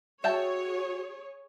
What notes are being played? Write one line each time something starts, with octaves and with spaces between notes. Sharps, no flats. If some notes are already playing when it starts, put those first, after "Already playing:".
F#4 G#4 C#5 E5 G5 A5